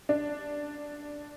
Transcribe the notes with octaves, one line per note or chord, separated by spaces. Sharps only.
D4